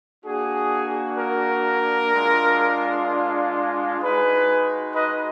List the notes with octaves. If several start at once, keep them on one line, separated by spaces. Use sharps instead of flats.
A#3 D4 F#4 G#4
A#4
G#3 D4 F4
G#3 D#4 F#4 G#4 B4
B4 D#5